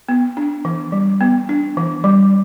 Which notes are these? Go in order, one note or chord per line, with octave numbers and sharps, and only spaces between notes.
B3
D4
E3
G3
B3
D4
E3
G3